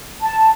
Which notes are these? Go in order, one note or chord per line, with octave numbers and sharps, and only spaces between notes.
A5